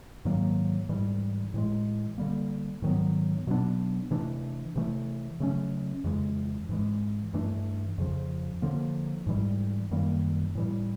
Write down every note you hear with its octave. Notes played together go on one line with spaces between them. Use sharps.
G#2 D#3 F#3 A#3
G#2 E3 G3
A2 E3 G#3
D3 G3 A#3
G#2 D#3 F#3 B3
B2 F#3 B3 D4
C3 E3 A3 D4
C3 E3 A3
C#3 F#3 A3 C#4
F2 C#3 E3 G#3
G#2 E3 G#3
G2 E3 A3 D4
F2 C#3 F3
D3 F3 A#3
G#2 E3 G3
F#2 D#3 G3 A#3
A2 E3 G3